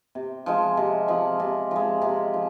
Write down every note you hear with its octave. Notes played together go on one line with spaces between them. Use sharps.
C3
F3 G#3
C3
F3 G#3
C3
F3 G#3
C3
F3